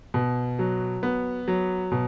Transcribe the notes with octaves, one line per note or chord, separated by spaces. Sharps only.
B2
F#3
B3
F#3
B2